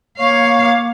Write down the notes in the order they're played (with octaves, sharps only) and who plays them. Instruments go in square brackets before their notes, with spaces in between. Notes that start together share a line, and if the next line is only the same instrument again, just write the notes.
[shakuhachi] A#3 [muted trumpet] C#5 [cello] F5